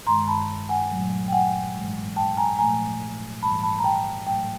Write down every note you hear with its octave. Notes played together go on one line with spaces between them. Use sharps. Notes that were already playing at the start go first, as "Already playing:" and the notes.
G2 D#3 G#3 A#5 C6
A5 B5
F#5 G#5
A#2 F#3 A3
G5
F#5 G#5
G#2 E3 G#3
G5 A5
G#5 A#5
A#2 F3 A3 G#5 A#5
G#2 E3 G3 A5 B5
A5 B5
A#5
G5 A5
A2 F#3 A3 G5 A5